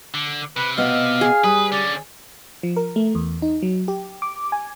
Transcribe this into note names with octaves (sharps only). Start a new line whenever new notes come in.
D3
C3 B4
B2 B3 D#5 F5
G#4
G3 B4 D#6
D3 C#4 D5
F3
A#4
A3
E2
D#4
F#3
G4
D6
G#5